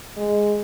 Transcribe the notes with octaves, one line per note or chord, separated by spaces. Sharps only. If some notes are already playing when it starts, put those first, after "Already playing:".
G#3